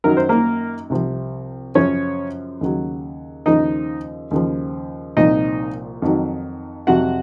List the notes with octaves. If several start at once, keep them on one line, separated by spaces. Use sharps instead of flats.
F#2 D#3 F#3 A#4
C5
A#3 A#4
C2 C3 F3
F#2 C#3 F3 C#4 C#5
D#2 C#3 F#3
D#2 C#3 F3 D#4 D#5
D#2 C#3 F3
C2 A#2 F3 D#4 D#5
F2 D#3 F#3
F2 C3 F#3 F#4 F#5